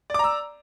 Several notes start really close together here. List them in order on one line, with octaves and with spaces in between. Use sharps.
D5 D6 A#5 E6